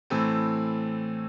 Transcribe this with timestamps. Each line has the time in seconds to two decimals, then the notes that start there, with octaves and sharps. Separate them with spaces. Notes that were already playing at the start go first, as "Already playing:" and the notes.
0.10 A2 E3 A3 C4